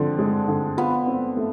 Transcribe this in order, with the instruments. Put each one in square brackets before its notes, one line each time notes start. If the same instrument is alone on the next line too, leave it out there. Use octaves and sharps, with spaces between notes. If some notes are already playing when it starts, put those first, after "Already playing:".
Already playing: [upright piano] D3 F3 [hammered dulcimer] C4
[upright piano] G#3
D3
[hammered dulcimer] B3 [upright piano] F4
[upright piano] C4
A3